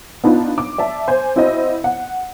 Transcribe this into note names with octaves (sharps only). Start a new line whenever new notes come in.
B3 D4 D#4 F4
D6
D5 E5 A5
C5 G#5
C4 E4 F#4 C5 D#5
F#5